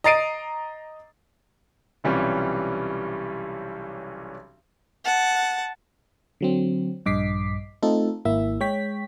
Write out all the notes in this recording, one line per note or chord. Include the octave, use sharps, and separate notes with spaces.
D#5 A#5 A6 C7 D7 D#7
B1 C3 E3 G3 C#4 F4
F#5 A5
D3 F#3 C4
A#1 G2 D#5 D6 B6 C7
A3 C4 D#4 F4 A4
G#1 A#3 E4 E5
G#3 C#5 G5 B6